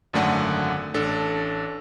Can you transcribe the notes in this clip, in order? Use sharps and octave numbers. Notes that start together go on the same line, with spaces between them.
G#1 F#2 D3 A3 D5 F#5
A1 D4 A4